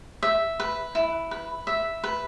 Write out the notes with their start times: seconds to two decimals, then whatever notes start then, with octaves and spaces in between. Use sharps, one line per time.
0.23 E5
0.60 B4
0.95 E4
1.31 B4
1.67 E5
2.04 B4